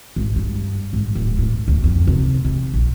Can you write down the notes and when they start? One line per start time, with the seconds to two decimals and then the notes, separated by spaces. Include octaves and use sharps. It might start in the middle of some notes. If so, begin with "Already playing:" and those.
0.16 G#1
0.36 G2
0.93 G#1
1.15 D1
1.39 A2
1.68 D2
1.84 F2
2.07 C3
2.45 C3
2.74 A#1